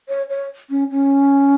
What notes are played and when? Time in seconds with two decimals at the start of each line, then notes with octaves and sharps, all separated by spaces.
0.09 C#5
0.30 C#5
0.70 C#4
0.90 C#4